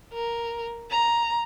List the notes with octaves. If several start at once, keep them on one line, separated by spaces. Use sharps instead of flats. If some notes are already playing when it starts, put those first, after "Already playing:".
A#4
A#5